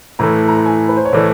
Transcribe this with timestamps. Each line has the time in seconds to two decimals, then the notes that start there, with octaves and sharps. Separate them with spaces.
0.19 A2 E3 A3 A#5
0.48 A#5
0.57 A5
0.66 G#5
0.89 B4
0.97 C5
1.05 C#5
1.13 A2 E3 A3 D5